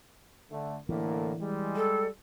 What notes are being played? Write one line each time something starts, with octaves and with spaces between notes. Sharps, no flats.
D3 A3
A2 D3 E3 A#3
G3 G#3
A4